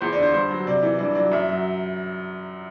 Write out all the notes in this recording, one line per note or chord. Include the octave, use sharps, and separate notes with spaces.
E2 C5
D5
D3 C5
G2 C5
F#3
C3 D5
E3
G2 D5
F#3 D5
F#2 E5
F#3